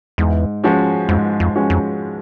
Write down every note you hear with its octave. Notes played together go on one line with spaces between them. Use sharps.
E2 G#2
F3 G#3 C#4 F#4
F2 G#2
F2
F3 G#3 C#4 F#4
F2